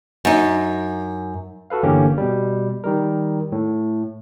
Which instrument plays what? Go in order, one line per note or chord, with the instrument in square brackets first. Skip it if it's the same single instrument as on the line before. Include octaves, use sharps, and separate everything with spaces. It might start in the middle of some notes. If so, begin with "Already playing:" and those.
[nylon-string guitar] F#2 D#4
[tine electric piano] F#4 A4 B4 F5
G1 D3 E3 A#3 C#4 G4
B2 G3
D#3 G3 A#4
A2